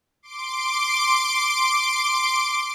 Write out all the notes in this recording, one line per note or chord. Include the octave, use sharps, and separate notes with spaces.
C6 D6 D7